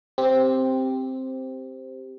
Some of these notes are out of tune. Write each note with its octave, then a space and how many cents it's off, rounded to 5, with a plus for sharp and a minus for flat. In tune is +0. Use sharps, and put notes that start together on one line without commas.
C4 +0 G4 +0